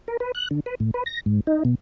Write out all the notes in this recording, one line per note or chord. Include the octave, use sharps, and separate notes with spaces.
A#4
B4
F#6
D3
B4
A2
B4
A#6
G#2
D#4
B2